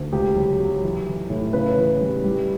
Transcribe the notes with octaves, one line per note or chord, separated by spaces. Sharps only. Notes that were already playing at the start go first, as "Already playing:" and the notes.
Already playing: D2
C#2 G4
F#3
F#3
E3
E3
A2
C#3 B4
E3
G3
G3